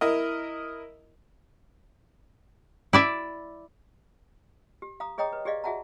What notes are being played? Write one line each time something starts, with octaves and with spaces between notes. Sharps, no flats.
E4 A#4 D#5
E4 D5 E5
G4
F5 A#5 D#6
G#4 C#5 D#5 G5 A#5 D#6
B4
G4 G#4 D5 D#5 F5
F#4 G#4 E5 F#5 A5 A#5